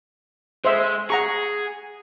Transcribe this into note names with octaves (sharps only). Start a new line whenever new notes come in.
G#3 C5 E5
G#4 F#5 A#5 C#6